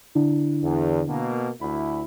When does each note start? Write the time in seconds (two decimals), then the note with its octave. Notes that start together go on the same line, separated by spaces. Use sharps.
0.15 D3 D4 E4
0.63 E2
1.08 B2 A#3
1.61 D2 E4 B5